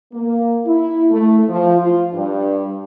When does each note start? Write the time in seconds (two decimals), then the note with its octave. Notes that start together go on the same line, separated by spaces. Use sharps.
0.14 A#3
0.67 E4
1.11 A3
1.49 F3
1.80 F4
2.14 G2